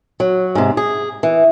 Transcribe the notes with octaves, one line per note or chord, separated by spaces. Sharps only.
F#3
G#2 C3
G#4
E3